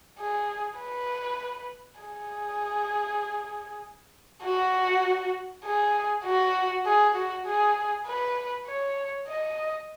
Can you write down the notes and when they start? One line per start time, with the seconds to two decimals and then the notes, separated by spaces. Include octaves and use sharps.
0.19 G#4
0.79 B4
2.01 G#4
4.43 F#4
5.64 G#4
6.25 F#4
6.86 G#4
7.15 F#4
7.46 G#4
8.07 B4
8.67 C#5
9.28 D#5